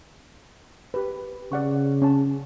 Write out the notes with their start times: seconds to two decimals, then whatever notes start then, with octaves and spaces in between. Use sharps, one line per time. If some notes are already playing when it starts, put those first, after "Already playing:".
0.94 G4 B4
1.52 C#3 D5 F#5 C#6
2.02 C#4 A5